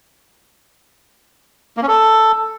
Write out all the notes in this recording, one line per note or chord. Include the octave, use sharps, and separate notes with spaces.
A#3
C#4
A4